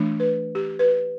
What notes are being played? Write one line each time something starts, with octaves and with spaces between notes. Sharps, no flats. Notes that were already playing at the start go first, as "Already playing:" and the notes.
Already playing: E3 A3 D4
B4
G4
B4